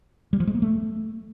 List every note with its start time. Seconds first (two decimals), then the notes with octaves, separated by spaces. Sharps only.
0.33 G3
0.40 F3
0.47 G#3
0.55 A#3
0.62 A3